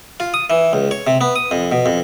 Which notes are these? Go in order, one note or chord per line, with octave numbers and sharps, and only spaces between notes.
F4
D#6
E3
C#2
C#5
C3
B3
D#6
F2
B2
F2